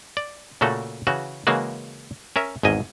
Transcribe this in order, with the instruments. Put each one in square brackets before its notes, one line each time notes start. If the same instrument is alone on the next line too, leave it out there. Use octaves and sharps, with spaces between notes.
[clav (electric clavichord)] D5
A#2 C#3 A3 F#4 A4
C#3 E3 F#4
C#3 E3 G#3 A#3 F#4
C#4 A#4 E5
G#1 E2 G#2 D#5 G#5